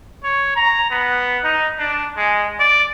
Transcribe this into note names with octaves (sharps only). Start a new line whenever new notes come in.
C#5
A#5
B3
D#4
D4
G#3
D5